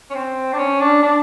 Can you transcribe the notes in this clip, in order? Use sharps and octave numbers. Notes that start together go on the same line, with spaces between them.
C#4
C4
D4
C#4
D4
D4